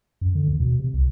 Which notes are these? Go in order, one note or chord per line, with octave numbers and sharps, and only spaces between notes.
F#2
D3
D#2
B2
C3
C2